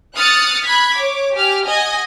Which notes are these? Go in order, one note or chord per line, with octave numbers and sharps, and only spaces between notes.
D#6 F6 F#6 A6 C#7
B5 F#6 G#6 B6
C#5 D6
G4 G#5 F6
D#5 F#5 G#5